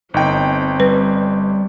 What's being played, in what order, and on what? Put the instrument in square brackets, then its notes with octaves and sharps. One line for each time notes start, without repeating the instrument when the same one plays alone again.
[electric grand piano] G1 D#4 G5 [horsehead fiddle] C4
[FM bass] G3 [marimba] B4